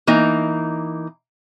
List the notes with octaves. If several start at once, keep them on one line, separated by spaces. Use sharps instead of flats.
E3 A#3 D#4